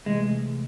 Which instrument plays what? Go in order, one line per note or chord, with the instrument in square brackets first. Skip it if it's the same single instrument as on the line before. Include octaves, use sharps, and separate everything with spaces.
[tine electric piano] C3 E3 A3 [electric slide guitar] G#3